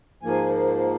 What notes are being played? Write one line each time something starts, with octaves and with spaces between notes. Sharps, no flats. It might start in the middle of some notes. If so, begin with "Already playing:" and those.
G#2 F3 A#3 G#5